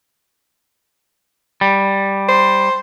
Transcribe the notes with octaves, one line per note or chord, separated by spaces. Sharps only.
G3
C5